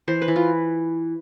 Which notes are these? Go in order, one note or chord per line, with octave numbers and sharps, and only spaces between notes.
E3 C5
B4
E3
F4